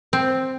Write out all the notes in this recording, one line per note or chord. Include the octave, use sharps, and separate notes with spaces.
C4